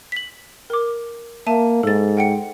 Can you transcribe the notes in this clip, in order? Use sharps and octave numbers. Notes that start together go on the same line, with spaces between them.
B6 F#7
A#4 D6
A#3 E5 A5 D#7
G#2 A4 A6
F#5 G5 C#7